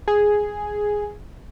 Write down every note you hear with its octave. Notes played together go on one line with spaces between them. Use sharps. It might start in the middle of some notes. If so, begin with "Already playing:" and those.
G#4